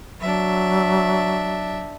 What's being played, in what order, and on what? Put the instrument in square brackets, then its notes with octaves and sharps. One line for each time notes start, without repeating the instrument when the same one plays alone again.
[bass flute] F#3 [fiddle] D4 E5